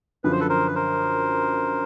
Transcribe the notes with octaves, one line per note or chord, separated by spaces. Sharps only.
F#2 D3 F3 B4
C5
A4 B4
A#4 C5
B4
A#4 C5